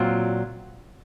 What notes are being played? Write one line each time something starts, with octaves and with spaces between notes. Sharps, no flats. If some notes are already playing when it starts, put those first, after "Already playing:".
Already playing: A#2 F#3 C4 F4